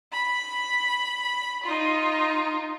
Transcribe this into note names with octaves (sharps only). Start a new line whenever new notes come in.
B5
D#4 F4